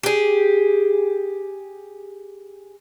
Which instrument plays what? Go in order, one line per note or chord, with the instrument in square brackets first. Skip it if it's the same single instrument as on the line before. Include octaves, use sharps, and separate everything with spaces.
[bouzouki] G4 G#4